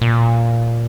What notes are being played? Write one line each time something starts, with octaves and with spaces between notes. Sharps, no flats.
A#2